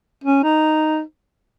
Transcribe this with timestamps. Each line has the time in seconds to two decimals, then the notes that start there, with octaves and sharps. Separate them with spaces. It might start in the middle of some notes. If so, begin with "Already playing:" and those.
0.24 C#4
0.44 D#4